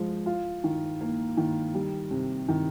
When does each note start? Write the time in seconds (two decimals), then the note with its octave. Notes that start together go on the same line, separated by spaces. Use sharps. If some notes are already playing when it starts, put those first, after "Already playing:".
Already playing: F3 G#3
0.26 F4
0.64 D#3
1.01 A#3
1.37 D#3
1.75 G3
2.11 C3
2.48 D#3